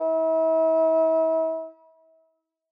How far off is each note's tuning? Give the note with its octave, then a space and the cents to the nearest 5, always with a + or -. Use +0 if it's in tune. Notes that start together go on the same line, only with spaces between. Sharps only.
E4 -40